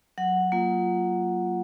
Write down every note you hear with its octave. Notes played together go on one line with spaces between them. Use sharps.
F#3 F#5
A#3 F4